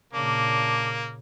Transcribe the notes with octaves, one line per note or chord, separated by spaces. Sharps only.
A#2 C#3 A#3 D4